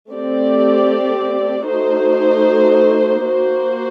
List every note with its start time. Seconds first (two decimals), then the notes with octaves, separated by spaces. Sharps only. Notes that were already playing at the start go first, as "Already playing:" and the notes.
0.11 A3 C4 G4 D5
1.68 A3 D#4 F#4 C5
3.26 A#3 F#4 C5